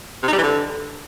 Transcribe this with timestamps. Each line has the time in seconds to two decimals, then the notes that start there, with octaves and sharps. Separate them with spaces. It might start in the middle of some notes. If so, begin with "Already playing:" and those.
0.23 C3
0.28 D#4
0.33 G3
0.38 E3
0.43 D3